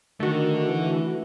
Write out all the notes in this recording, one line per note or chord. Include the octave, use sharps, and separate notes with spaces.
D3 D#3 A3 F#4
E3